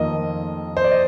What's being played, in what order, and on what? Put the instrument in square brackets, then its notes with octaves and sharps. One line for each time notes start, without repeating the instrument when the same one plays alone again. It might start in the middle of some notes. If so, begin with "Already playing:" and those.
Already playing: [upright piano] F2 D#3 A#3 F4 [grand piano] D#5
[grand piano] C5
D5
D#5